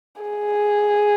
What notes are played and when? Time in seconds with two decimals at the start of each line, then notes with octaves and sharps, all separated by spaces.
0.22 G#4